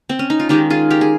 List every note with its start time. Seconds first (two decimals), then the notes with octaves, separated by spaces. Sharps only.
0.09 C4
0.19 C#4
0.30 D#4
0.39 F4
0.49 D#3 G#3 D#4 G4
0.70 F4 G#4
0.90 G4 A#4
1.01 G#4